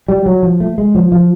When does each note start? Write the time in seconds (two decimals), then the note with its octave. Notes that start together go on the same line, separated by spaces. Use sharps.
0.08 G3
0.26 F#3
0.43 F3
0.60 A3
0.78 G#3
0.95 F3
1.12 F3